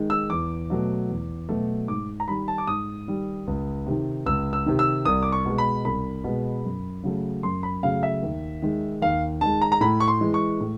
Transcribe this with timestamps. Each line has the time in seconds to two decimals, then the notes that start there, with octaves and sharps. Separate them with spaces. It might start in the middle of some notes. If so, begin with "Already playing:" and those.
Already playing: D#3 G#3
0.10 E6
0.30 E2 D6
0.70 B2 F#3 A3
1.09 E2
1.49 B2 F#3 A3
1.88 G#2 D6
2.20 A#5
2.28 D#3 G3 B5
2.48 A5
2.58 D6
2.67 G#2 D#6
3.08 D#3 G3
3.47 C#2
3.86 C3 D#3
4.26 C#2 E6
4.53 E6
4.66 C3 D#3
4.79 E6
5.05 C2 D#6
5.23 D6
5.32 C#6
5.45 B2 G#3
5.58 B5
5.85 C2 B5
6.24 B2 G#3
6.64 F#2
7.03 C#3 F#3 A3
7.43 F#2 C6
7.63 B5
7.83 C#3 F#3 A3 F5
8.03 E5
8.23 D#2
8.62 D#3 G#3
9.02 D#2 F5
9.41 D#3 G#3 A5
9.61 A#5
9.72 A#5
9.81 A2 B5
10.00 C#6
10.08 C6
10.21 E3 G#3
10.34 C#6
10.60 A2